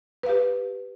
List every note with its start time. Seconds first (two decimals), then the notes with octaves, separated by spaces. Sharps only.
0.23 B4
0.26 F5
0.29 G4